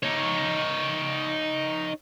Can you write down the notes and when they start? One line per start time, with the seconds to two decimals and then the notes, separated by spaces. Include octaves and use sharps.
0.03 D#4 C#5